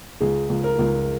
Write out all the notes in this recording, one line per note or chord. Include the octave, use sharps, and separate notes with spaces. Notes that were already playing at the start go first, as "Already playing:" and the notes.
C#2 G#4
C#2
A#4
C#2